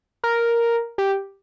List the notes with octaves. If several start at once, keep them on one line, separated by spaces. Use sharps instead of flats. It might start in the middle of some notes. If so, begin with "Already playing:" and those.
A#4
G4